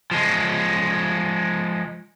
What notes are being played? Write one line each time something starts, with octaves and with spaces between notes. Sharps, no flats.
F3 G#3